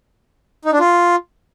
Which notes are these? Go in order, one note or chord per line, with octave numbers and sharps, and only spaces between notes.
D#4
D4
F4